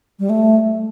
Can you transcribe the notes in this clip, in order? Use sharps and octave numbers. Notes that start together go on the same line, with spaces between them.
G3
A3